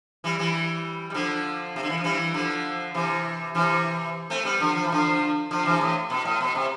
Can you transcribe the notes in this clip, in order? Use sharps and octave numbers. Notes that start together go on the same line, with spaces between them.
E3 G3
E3 G3
G3
D3 F3
C3
D3
E3
F3
E3 G3
D3 F3
C3 E3
C3 E3
A3 C4
G3 B3
D3 F3
F3
E3
D3 F3
D3 F3
C3 E3
A2
B2
A2
B2
C3